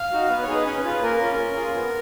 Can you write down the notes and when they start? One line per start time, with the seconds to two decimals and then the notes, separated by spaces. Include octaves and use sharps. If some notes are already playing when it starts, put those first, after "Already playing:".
Already playing: F5
0.12 D#4 F#4
0.30 B3 B4
0.43 C#5
0.48 D#4 G#4
0.55 B4
0.66 C#4 C#5
0.78 B4
0.84 F4 G#4
1.02 A#3 A#4
1.20 C#4 F4
1.38 C#4
1.56 F4 G#4
1.75 B3